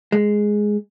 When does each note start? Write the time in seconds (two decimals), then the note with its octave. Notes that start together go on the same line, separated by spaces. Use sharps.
0.12 G#3